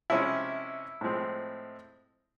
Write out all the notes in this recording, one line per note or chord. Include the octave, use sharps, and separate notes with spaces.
C3 F3 G#3 C#4 E4
A2 F3 G#3 C4